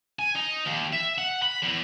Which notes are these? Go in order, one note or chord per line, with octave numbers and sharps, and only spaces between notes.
G#5
D#4
D#2
E5
F#5
B5
E2